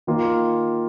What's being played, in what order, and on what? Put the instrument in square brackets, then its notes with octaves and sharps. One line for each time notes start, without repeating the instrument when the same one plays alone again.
[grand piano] D#3 A#3 F4